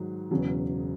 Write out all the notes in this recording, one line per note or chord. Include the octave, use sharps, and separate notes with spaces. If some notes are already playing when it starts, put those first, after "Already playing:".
Already playing: G#2 D#3 F#3
E1 E2 C#3 F#3